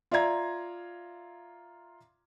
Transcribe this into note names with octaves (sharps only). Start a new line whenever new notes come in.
F4 D5 E5 F5 A#5 G#6